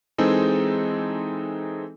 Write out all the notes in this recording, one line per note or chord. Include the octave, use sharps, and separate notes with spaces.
E3 G#3 C4 D#4 G#4 A4